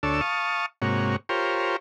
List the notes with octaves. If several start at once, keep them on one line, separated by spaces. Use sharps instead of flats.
D2 D4 A4 C#5 E6
F5 A5 C#6 D#6
G#2 C3 A#3 F#4 C#5
F4 G4 A#4 C5 C#5